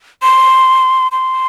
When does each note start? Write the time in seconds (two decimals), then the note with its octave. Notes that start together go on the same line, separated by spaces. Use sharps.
0.22 C6
1.12 C6